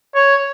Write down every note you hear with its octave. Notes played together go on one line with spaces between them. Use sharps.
C#5